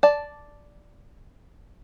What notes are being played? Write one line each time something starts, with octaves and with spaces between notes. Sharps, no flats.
D5 A5